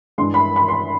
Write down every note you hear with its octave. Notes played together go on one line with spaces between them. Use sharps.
G2 E3 G#3 C6
B5
B5
C6